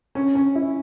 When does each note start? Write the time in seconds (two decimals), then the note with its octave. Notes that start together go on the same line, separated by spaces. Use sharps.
0.15 C#4
0.35 C#4
0.55 E4